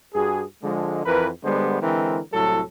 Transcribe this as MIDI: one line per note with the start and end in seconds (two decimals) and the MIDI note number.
0.14 0.44 43
0.14 0.44 66
0.14 0.44 68
0.63 1.02 50
0.63 1.02 53
0.63 1.02 56
1.06 1.29 41
1.06 1.29 52
1.06 1.29 70
1.06 1.29 71
1.44 1.78 50
1.44 1.78 55
1.44 1.78 56
1.44 1.78 59
1.44 1.78 72
1.82 2.20 50
1.82 2.20 52
1.82 2.20 56
1.82 2.20 60
1.82 2.20 70
2.34 2.61 36
2.34 2.61 45
2.34 2.61 54
2.34 2.61 69